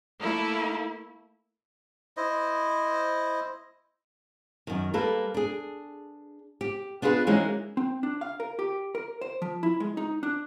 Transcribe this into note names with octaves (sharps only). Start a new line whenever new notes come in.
A3 A#3 E4 A4
E4 C5 D#5
F#2 D#3
G3 A#3 A4 B4
D4 G#4
G4
B3 D4 F4 G#4 B4
E3 G#3 A#3 C#4 D#4 F#4
C4
D4
F5
A#4
G4
A#4
C5
F3
E4
G#3
D#4
D4